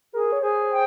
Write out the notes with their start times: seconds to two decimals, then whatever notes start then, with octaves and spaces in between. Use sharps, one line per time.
0.13 G#4 A#4
0.32 C#5
0.42 G#4 C5
0.71 G5